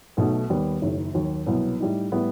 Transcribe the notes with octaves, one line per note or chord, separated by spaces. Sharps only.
B1 B2 A3 D#4
D#2 D#3 G3 B3
F#1 F#2 D#3
D#2 D#3 F#3
C2 B2 F#3 B3
A2 G3 D#4
A2 G3 B3